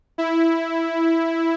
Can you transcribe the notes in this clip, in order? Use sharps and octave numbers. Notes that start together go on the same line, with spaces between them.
E4